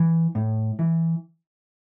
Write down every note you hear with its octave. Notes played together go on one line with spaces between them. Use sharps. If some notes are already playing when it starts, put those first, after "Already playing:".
Already playing: E3
A2
E3